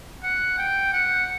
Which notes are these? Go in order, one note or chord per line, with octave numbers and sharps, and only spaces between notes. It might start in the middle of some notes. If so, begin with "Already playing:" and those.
F#5
G5
F#5